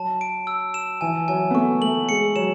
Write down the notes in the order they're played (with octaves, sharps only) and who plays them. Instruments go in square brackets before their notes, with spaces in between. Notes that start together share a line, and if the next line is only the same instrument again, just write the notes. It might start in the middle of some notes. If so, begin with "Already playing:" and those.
Already playing: [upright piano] F#3 [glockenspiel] A5
[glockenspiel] D7
E6
E7
[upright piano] E3 [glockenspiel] G#5
[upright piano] F#3 [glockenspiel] G#5
[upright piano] B3
[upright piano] A3 [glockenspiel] C#6
[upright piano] A3 [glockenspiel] F#7
[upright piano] G#3 [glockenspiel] C#7
[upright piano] F#3 [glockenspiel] E7